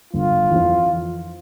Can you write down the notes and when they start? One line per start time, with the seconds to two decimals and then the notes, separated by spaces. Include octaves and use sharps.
0.13 G1 F4
0.51 F2 E3